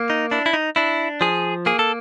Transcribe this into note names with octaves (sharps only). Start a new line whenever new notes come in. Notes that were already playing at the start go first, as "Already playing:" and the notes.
Already playing: A#3
D#4
D4 E4
E4
D#4
D4 E4
F3 G#4
A#3 G#4
A4